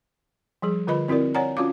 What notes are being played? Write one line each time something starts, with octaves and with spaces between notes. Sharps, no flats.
F3 G3 G#4
D3 F4 B4 D#5 B5
C4 E4 F#4 A#4 D5
C#5 D5 F#5 G#5 A#5
C#4 F4 F#4 F5 D6